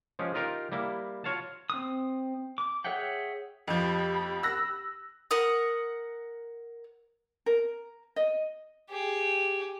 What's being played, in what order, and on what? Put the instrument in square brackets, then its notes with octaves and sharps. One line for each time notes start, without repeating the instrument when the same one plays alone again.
[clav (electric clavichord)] F3 G#3 C#4 G4 G#4
D#4 F4 G4 A#4
G3 A#3 E4
F4 F#4 C#5 F5 F#5 A5
[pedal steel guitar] C4 D#6
D6
G#4 C#5 E5 F#5 G5
[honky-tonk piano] F2 F3 [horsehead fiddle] G4 B5
[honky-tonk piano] E6 F#6 A#6
[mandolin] A#4 F#5 D#6
[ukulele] A#4
D#5
[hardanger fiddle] G4 G#4